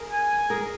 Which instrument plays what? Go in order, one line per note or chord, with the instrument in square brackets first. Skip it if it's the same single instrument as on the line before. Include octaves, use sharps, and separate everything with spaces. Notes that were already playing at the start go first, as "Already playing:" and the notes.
Already playing: [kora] G#4 A#4
[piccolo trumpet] G#5
[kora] G#4 A#4